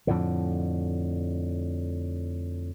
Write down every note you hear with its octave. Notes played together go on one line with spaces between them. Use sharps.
F2 A2 D3